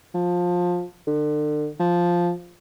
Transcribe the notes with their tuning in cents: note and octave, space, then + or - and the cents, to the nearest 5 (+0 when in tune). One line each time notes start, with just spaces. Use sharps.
F3 +20
D3 +35
F3 +0